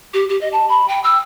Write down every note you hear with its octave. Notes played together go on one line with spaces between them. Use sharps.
G4
G4
D#5
A5
B5
G5
E6